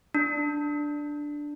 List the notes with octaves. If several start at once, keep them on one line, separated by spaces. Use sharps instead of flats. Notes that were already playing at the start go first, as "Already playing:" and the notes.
D4